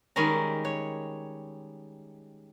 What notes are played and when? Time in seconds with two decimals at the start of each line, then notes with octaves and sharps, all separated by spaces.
0.16 D#3 G3 G#3 C#4 A#4
0.65 C#5